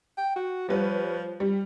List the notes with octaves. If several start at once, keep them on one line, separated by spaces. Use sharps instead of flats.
G5
F#4
F3 G3 B4 C#5
G3